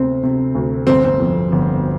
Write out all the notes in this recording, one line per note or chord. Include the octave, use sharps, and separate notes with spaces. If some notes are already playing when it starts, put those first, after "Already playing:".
Already playing: D2 C3 C4
C3
D2
G1 C4
C4
F2
G1